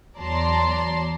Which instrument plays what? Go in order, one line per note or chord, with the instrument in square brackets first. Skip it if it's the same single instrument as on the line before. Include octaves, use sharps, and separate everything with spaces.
[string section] E2 F#3 D5 A5 A#5 C6